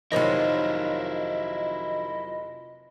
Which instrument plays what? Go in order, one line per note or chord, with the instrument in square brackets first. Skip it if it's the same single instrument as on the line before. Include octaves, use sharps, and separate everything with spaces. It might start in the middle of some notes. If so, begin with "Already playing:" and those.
[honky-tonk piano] F1 A#3 [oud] D#3 F3 F#3 [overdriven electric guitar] E4 F4 [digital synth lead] D#5